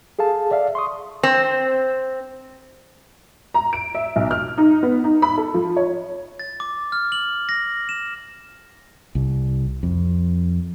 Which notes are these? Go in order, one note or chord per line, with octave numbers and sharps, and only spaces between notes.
G#4 A4 F5 A5
D5 E5 F5
C6 C#6 D#6
C4
A#5
D7
E5
B1
F6
D#4
B3
D#4
B5
A4
F3
C#5
A6
D6
F6
F#7
A#6
E7
C2
F2